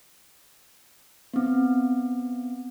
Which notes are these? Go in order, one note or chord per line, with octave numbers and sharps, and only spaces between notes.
B3 C4